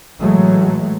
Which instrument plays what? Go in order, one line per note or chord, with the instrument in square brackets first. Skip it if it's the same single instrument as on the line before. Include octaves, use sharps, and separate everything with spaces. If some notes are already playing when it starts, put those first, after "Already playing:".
[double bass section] A2 E3 F#3 G#3 A3